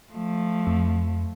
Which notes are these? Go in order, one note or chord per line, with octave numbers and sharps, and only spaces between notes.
F3 A3
F2